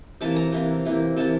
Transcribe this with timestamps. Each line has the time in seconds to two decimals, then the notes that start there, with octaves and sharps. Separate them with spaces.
0.21 C3 E3 A#3 A5
0.36 A#5
0.52 C3 E3 A#3
0.85 C3 E3 A#3
1.16 C3 E3 A#3 A5